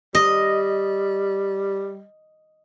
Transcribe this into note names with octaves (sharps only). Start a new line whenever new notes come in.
G3 D#5